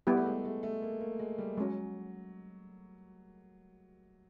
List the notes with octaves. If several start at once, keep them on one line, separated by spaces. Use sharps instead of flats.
G3 A3 B3 E4 G4
A3
G#3
A3
A3
A#3
A#3
G#3
G3
F#3 G#3 C#4 F#4